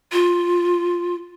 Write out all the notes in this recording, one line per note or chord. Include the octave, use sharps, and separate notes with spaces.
F4